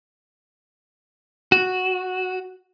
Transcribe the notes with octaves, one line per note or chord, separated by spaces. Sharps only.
F#4